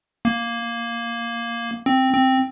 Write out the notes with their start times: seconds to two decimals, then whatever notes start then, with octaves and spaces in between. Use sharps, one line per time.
0.25 A#3
1.86 C4
2.14 C4